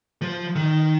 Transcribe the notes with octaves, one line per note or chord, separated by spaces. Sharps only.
F3
D#3